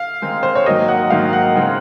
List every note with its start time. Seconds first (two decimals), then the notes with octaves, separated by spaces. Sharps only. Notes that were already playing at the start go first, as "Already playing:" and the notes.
Already playing: F5
0.22 D#3 G#3 C4 D#4
0.43 C5
0.55 C#5
0.66 G#2 D#3 F#3 A#3 D#5
0.88 F#5
1.10 G#2 D#3 F#3 A#3 F5
1.33 F#5
1.56 C#3 G#3 C4 D#4